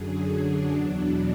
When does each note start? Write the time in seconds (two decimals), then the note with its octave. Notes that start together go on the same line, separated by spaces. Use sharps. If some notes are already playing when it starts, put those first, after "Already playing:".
Already playing: F#2 D3 F#3 G#4
0.25 D4
0.70 E2 B2 F#3